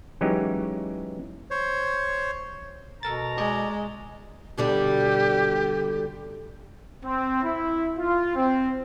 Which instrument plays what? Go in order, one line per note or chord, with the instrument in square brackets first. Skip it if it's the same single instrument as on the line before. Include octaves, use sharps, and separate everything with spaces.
[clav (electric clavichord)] E3 F#3 G#3 C#4 D#4 G4
[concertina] C5 C#5
[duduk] B2 [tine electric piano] A4 A#4 A6 [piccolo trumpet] A#5
[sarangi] G#3 [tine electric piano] D5
[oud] B2 D3 G3 [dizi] G4
[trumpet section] C4
E4
F4
C4